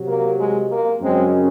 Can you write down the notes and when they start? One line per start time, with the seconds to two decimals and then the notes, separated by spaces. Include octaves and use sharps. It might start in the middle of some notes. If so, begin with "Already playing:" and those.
Already playing: C3 F#3
0.08 A#3
0.39 G#3
0.70 A#3
1.02 F#2 C#3 F#3 G#3 C4